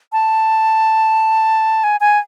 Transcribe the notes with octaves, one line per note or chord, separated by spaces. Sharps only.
A5
G#5
G#5